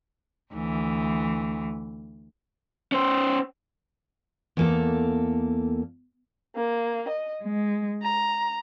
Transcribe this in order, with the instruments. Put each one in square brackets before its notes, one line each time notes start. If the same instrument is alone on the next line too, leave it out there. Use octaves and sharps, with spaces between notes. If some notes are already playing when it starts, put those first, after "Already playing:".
[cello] D2 E3
[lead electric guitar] C#4 C5
[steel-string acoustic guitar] E2 A#3 A4
[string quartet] A#3
D#5
G#3
A#5